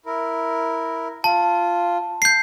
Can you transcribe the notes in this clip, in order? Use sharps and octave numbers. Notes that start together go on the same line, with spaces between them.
E4 A#4
F4 A5
G6 C7